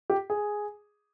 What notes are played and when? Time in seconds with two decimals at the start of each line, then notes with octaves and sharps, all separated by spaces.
0.10 G4
0.30 G#4